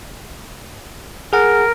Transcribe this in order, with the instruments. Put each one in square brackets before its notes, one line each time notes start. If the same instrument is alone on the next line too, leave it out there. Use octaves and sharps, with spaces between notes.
[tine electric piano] G#4 F#5 [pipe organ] A#4